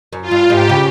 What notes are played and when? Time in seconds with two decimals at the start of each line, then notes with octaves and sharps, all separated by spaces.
0.13 F#2
0.22 F4
0.31 G2
0.50 G#2 G4
0.69 C#3